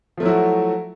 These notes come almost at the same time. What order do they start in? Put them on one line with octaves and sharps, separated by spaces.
F3 A3 F#3 E4 F#4